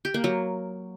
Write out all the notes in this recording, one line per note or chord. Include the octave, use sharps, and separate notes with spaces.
G4
A#3
F#3